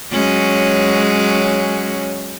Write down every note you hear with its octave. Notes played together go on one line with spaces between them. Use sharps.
F#3 G#3 C#4